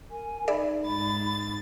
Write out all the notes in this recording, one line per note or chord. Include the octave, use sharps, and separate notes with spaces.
A#4 G#5
D#4 G#4 D5 E5 B5
G#2 A6